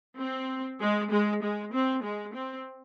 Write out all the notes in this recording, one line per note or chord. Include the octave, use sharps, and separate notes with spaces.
C4
G#3
G#3
G#3
C4
G#3
C4